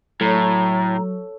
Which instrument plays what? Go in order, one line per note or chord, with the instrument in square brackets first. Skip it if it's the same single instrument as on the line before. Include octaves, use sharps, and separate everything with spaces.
[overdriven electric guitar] A2 [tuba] F#3 [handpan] A4 C#5 [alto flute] A#5